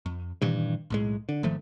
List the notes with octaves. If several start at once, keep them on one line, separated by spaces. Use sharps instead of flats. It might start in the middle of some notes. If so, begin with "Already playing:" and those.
F2
G2 A#2 D#3 E3
B1 A2 G#3
D3
G#1 D#3 F3 A3